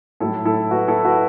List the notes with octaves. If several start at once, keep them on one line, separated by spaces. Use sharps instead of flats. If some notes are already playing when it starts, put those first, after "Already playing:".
A2 F#3 A3 E4 A4
E4 A4
F#4 B4
E4 A4
F#4 B4